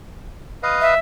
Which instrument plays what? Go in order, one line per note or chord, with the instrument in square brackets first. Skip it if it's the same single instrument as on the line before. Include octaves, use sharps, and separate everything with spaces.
[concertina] B4 D#5 F5
[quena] E5